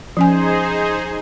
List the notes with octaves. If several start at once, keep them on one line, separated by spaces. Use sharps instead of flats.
F3 C#4 D#4 G#4 C5 G#5